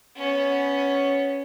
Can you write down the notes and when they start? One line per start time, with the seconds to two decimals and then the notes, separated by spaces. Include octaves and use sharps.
0.16 B3 C#4